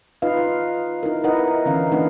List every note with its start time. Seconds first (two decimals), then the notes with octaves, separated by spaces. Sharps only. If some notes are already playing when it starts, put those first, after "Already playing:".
0.22 D#4 F4 B4 D#5 F5
1.03 D#4 E4 A#4
1.24 D#4 E4 A#4 B4 D#5 F#5
1.65 D3 E3 C#4 F5
1.91 E3 A#3 D4 D#4 B4 F#5